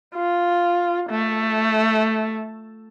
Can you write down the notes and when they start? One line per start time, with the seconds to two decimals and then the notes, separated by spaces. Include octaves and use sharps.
0.15 F4
1.10 A3